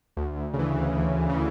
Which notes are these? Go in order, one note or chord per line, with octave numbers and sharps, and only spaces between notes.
D2
C#3
E3
D2
C#3 E3